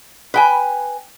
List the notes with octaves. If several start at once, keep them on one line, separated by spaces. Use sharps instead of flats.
B4 G5 G#5